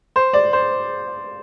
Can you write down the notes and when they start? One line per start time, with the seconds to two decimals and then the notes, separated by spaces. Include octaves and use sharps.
0.16 C5
0.33 D5
0.53 C5